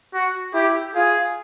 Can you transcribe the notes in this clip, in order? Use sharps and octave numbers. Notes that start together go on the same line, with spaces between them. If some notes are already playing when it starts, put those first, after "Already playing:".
F#4
E4 G4
F4 G#4